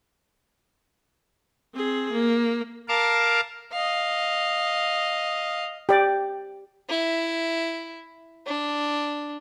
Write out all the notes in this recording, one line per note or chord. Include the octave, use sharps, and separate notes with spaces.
C4 G#4
A#3
A#4 F5 A5 D6
D#5 F5
G4 D5
E4
D4